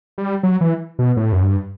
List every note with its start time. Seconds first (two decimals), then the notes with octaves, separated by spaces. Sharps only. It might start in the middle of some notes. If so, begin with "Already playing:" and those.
0.18 G3
0.43 F#3
0.61 E3
0.99 B2
1.17 A2
1.32 F#2
1.42 G2